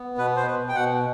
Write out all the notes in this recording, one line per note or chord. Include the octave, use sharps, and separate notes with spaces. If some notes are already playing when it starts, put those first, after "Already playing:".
Already playing: B3
B2 B4
C5
B2 B4
G5
B2 F#5